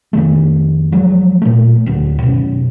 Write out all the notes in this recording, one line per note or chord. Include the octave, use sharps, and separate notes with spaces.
F2 D#3 A3
F3 F#3 G#3
A#2 A3
D1 D2
F#2 B2